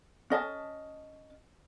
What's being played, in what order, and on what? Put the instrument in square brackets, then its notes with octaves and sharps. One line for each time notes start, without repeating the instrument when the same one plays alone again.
[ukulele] C#4 D#5 A5